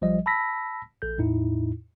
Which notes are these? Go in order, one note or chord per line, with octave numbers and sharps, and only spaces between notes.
A#1 F3 G3 D#5
A5 B5 E6 A#6 B6
A#1 A4 G6
E2 A2 D#4 E4